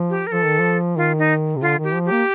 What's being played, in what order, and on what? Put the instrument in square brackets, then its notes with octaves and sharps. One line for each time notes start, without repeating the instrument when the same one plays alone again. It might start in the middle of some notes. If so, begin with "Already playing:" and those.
Already playing: [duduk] F3
[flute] G4
A#4
[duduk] F3 [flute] A4
[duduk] D#3
F3
[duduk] D#3 [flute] F4
[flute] D#4
[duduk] C3
[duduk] D3 [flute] F4
[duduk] D#3
[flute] G4
[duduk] F3
[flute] G4
[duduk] A#3